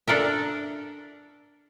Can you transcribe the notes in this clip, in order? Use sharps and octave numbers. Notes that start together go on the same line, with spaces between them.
D4 A4 A#4 E5